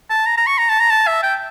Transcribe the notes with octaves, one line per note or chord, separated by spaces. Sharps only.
A5
A#5
A#5
C#6
A#5
A5
A#5
A5
E5
G5